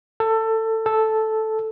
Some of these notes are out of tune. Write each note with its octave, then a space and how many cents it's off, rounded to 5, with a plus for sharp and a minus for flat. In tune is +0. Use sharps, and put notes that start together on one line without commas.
A4 +20
A4 -5